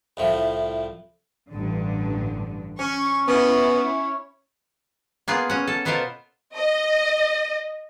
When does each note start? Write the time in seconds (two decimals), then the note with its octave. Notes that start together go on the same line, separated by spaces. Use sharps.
0.17 C2 A2 F3
1.51 A1 G2 D3
2.79 C#4 C#6
3.28 B3 C#4 E4 C#5
5.28 A#3 B3 F4 G#4
5.50 C#4 F#5
5.67 A4
5.85 B2 B3 F4 A4 A#4 C5
6.56 D#5